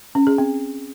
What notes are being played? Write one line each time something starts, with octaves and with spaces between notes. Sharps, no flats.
C#4
G#4
C4